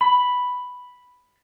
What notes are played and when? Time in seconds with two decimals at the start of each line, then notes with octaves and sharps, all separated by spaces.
0.01 B5